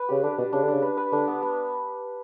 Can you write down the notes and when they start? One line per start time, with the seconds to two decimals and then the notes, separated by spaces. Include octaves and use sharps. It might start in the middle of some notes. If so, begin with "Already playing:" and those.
Already playing: B4
0.09 C#3 G4
0.23 D3 D4
0.38 B2 D4
0.53 C#3 D4
0.63 D3
0.68 C#3 D4
0.82 B4
0.97 B4
1.12 D3 D4
1.27 B3
1.42 B3